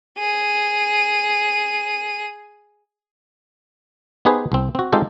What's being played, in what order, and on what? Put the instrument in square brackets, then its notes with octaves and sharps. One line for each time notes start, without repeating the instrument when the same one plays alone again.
[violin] G#4 D#7
[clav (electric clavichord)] B3 D#4 G4 G#4 B4 C5
C2 C4
C4 F#4
G#3 C4 D#4 F4 G4 A4